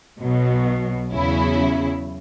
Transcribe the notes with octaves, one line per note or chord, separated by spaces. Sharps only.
B1 B2 F#3
E2 C#3 F#3 C#4 E4